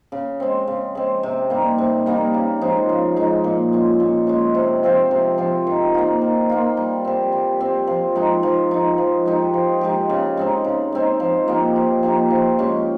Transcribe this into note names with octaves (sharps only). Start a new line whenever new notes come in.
C#3
G#3 C4
C#3
G#3 C4
C3
G3 A#3 D#4
C3
G3 A#3 D#4
C#3
F3 G#3 D#4
C#3
F3 G#3 D#4
A#2
G#3 C#4
A#2
G#3 C#4
C3
F3 C4 F4
C3
F3 C4 F4
D#3
A#3 F4
D#3
A#3 F4
G3
C4 G4
G3
C4 G4
F3
G#3 D#4
F3
G#3 D#4
F3
G#3 D#4 G4
F3
G#3 D#4 G4
C#3
G#3 C4 D#4
C#3
G#3 C4 D#4
F3
A#3 D#4 G4
F3
A#3 D#4 G4
F3
G#3 C#4 G4